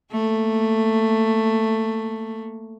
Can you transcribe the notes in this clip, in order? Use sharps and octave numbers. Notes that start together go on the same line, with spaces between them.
A3 A#3